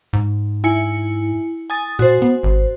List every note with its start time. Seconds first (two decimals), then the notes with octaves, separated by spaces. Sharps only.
0.13 G#2
0.64 E4 G#5 C#7
1.70 G#5 D#6 A6
1.99 A#2 F#4 C5
2.22 B3
2.43 G#1